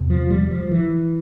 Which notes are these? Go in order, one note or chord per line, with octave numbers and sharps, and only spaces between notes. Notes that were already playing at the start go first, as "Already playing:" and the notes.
Already playing: E2 C3
F3
G3
F3
E3